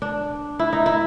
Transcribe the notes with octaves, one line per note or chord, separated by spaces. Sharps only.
D4
E4
D#4
E4